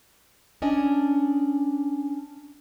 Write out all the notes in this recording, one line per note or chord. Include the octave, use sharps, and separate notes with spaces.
C#4 D4 D#5 G#5